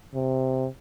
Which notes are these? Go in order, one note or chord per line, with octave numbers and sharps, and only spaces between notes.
C3